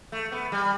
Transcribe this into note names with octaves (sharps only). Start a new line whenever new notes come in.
A3
B3
G3